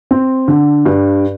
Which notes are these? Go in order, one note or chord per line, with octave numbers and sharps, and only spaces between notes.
C4
D3
G2